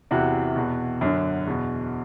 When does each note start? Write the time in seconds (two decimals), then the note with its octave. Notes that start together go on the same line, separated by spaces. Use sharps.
0.11 E2 C3 E3 F#4
0.56 E2 B2
1.01 F#2 D3
1.47 E2 B2